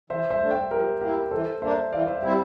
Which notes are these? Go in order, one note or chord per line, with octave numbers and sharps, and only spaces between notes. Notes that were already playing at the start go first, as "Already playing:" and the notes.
E3 C5 E5
C5 E5
A3 D4
E5 G5
F3 G4 A#4
A#3 E4 G4 A#4
E3 A4 C5
A#3 D4 C5 E5
E3 D5 F5
C5 E5
G3 C4 E4 G4